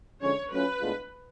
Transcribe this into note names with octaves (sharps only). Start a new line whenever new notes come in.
D3 F3 G#3 C#4 C#5
F#3 A3 C#4 F4 B4
A2 G#3 B3 D4 F4